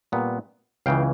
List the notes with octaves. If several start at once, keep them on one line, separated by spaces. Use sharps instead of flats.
A#2 G3 B3
C#2 C#3 E3 F5 G5